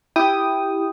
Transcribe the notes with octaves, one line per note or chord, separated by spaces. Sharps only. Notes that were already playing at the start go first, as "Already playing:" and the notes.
E4 G4 G5 D#6